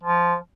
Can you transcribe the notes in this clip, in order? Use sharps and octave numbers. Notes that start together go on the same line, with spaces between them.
F3